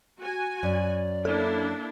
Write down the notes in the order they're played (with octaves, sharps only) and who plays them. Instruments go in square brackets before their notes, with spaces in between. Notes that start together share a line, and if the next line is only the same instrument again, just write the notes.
[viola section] F#4 G#5
[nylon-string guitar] F#2 [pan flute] D5
[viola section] A#3 D4 E4 [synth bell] A4